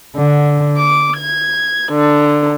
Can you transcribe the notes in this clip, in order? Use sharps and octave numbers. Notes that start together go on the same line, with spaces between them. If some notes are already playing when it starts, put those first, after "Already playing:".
D3
D6
G#6
D3